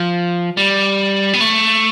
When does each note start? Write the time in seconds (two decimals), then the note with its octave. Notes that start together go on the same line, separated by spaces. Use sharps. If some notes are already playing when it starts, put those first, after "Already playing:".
Already playing: F3
0.57 G3
1.33 B3
1.41 A3